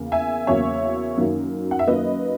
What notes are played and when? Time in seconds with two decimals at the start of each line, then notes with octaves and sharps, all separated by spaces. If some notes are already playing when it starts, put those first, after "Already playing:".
Already playing: E2 C#3 A#3
0.12 E5 G#5
0.47 E2 C#3 F#3 A#3 C#5 E5
1.17 F#2 D#3 F#3 A#3
1.71 F#5
1.79 E5
1.87 F#2 D#3 F#3 A#3 B4 D#5